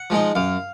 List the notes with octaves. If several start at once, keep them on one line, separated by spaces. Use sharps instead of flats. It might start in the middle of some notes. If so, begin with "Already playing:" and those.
Already playing: F#5
F3 G#3 D#4
F#2 F5